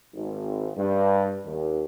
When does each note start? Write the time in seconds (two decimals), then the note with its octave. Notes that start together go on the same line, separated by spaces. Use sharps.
0.14 G#1
0.76 G2
1.45 D#2